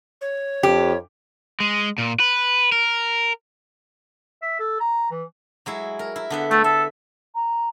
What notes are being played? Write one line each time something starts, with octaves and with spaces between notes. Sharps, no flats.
C#5
F2 G4
G#3
A#2
B4
A#4
E5
A4
A#5
E3
F#3 G#3 E4
A#4
E4
D3 B3 E5
A3 A4
A4 E5
A#5